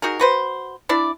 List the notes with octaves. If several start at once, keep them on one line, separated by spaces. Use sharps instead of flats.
D#4 F#4 G#4 A#4
F#4 B4 C5
D4 E4 D5